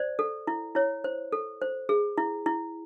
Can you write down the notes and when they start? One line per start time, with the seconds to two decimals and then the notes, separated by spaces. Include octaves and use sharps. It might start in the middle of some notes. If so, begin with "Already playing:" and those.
Already playing: C5 D5
0.19 A4
0.47 E4
0.75 E4 C#5
1.04 C5
1.32 A4
1.61 C5
1.89 G#4
2.18 E4
2.46 E4